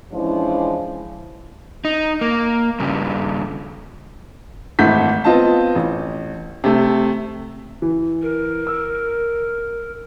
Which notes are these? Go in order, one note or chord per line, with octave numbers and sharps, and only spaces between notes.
E3 F3 G#3 C#4 D4 E4
D#4
A#3
G2 C#3
G#1 E3 A3 F#5 G6 B6
B3 C4 F4 D#5 F5 A5
A1
C3 A3
E3
A#4
E6